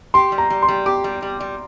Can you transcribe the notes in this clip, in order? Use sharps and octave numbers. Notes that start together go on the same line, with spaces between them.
G4 C6
G3
A#5
G3
C6
G3
G4 D6
G3
G3
G3